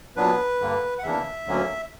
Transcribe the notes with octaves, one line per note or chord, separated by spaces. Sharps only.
A#2 F#3 B3 D4 B4
G2 D3 A#3
F#5
E2 C#3 E3 A#3 D4 E5
D2 D3 F#3 A#3 C#4